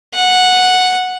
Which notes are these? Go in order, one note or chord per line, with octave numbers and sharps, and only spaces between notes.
F#5